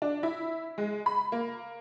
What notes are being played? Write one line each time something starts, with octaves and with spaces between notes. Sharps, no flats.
D4
E4
G#3
B5
A#3